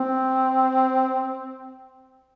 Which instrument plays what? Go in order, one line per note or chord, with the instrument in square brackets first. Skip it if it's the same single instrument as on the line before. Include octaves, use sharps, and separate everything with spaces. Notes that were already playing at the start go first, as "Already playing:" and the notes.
Already playing: [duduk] C4